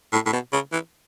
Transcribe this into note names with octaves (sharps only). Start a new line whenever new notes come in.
A2
A2
B2
C#3
E3